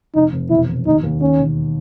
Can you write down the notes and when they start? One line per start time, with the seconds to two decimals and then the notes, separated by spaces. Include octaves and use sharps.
0.15 F1 D#4
0.33 F1
0.50 E1 E4
0.68 E1
0.86 D#2 D#4
1.03 D#2
1.21 D#3 C#4
1.39 E1